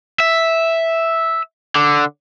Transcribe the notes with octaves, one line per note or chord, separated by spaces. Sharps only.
E5
D3